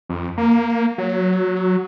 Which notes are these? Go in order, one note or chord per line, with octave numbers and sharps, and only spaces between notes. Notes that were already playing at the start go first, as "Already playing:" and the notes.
F2
A#3
F#3